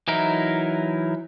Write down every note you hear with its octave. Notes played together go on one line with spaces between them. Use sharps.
E3 F#3 D#4 E4 A#4